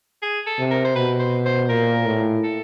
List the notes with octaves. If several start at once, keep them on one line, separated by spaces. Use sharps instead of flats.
G#4
A4
C3
A#4
C5
B2 B4
C5
C5
A#2 A#4
A2
A4